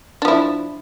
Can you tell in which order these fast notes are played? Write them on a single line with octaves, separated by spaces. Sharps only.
D4 F3 E4